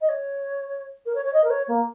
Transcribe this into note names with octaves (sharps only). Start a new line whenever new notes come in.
D#5
C#5
A#4
C#5
C#5
D#5
A#4
C#5
A#3